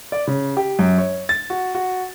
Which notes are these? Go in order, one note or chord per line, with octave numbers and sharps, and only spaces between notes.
D5
C#3
G4
F#2
C#5
A6
F#4
F#4